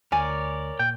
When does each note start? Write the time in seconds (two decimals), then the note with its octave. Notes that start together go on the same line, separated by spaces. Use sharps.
0.12 D2 A#4 C#5 D5 G#5
0.79 A#2 G5